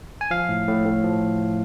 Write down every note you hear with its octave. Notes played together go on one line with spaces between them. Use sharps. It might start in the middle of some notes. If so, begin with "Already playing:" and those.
G#5
F3 F5
A2
A2
A2
F3